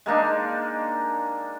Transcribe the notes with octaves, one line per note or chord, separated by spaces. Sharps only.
G#3 A#3 D4 D#4